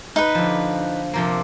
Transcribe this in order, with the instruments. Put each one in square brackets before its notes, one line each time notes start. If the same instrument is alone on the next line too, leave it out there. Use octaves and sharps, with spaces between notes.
[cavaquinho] D#4 B4
[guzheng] D3 F3
C3 F3 A#3